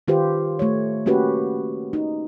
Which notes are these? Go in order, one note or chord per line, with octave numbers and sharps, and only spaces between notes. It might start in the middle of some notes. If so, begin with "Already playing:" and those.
D#3 F4 G4 B4 C5
A3 C#5
A#3 C#4 F#4 G4 B4
D#4